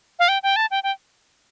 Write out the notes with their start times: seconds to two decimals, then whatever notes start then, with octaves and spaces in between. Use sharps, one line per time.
0.19 F5
0.28 G5
0.43 G5
0.56 A5
0.71 G5
0.83 G5